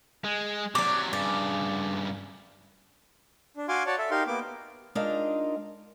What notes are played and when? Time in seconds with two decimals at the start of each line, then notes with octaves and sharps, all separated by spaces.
0.24 G#3
0.75 C3 F#3 D5 D6
1.13 G2 C#3 D5
3.57 D4
3.69 F#4 F5 G#5 C6 D6
3.87 F#4 C#5 D5 A5
3.99 A4 E5
4.11 D#4 G4 A#4 F5 C6
4.27 A#3 B3 D6
4.95 G#3 D4 D#4 F4 A#4 F5